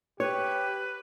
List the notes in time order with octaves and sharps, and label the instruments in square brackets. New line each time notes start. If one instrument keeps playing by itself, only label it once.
[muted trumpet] G4 [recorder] B4 [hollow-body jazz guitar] C#5